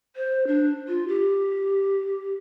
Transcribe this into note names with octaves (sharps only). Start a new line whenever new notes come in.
C5
D4
F4
G4